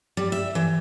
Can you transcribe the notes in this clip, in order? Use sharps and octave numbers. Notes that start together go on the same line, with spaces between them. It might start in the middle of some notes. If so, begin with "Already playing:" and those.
G3
E5
E3